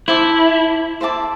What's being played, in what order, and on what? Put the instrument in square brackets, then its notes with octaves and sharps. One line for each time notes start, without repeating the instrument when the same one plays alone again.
[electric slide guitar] E4 [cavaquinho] C5 E5 A5 D6
[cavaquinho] C5 E5 A5 D6